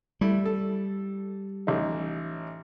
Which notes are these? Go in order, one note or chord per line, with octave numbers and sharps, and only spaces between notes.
G3 A3 E4
A4
A1 D#4